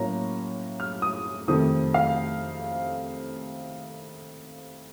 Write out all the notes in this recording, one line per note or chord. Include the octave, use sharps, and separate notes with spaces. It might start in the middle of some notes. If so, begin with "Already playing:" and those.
Already playing: A2 F#3 A#3 C#4 A#5
F6
D#6
F2 C3 D#3 A3 D#6
F5